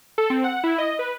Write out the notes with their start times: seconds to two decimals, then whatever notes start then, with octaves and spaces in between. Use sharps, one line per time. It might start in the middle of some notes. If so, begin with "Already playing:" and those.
0.18 A4
0.30 C4
0.44 F#5
0.64 E4
0.78 D#5
0.99 B4